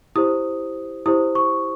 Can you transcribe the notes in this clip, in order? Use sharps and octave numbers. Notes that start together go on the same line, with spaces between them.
E4 G4 C5 D#6
E4 G4 C5 D#6
C#6